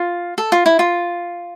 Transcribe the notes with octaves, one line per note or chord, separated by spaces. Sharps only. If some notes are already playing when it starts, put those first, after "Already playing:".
Already playing: F4
A4
F4
E4
F4